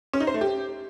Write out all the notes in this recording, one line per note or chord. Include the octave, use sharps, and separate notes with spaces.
C#4
D#4
C5
A3
G4